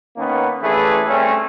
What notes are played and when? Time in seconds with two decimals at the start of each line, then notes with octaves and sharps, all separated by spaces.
0.17 D#3 A#3 B3 C#4
0.62 A1 E3 A3 D4 G#4 B4
1.07 G3 A3 C4 C#4